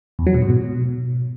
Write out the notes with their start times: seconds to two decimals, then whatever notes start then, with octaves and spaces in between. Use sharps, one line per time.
0.19 E2
0.27 F#3
0.34 B2
0.42 G#2
0.50 B2